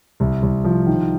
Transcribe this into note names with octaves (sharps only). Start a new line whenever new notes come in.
C2
C2
F3
D#3